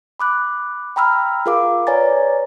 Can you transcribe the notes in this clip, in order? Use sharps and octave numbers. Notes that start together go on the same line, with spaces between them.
B5 D6 F#6
G5 A#5 B5 E6 F6
F4 G#4 A#4 F5 D6
B4 C#5 D5 G#5 A#5 A6